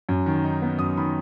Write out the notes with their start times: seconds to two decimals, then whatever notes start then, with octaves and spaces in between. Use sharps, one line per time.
0.09 F#2
0.26 D#3
0.44 D#4
0.62 B3
0.79 F#2 D#6
0.97 D#3 B5